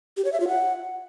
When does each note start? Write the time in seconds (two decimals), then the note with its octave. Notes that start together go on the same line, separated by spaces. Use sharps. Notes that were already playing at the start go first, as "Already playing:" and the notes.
0.17 G4
0.25 C#5
0.32 E5
0.40 F4
0.48 F#5